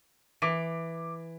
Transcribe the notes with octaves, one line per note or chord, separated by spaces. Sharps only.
E3 D6 B6 D7